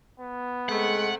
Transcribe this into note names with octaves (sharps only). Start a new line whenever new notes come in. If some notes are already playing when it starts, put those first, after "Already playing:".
B3
C3 G#3 A3 F#5